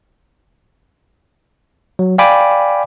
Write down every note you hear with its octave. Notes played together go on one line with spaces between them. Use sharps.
F#3
D5 F5 G5 G#5 B5 D6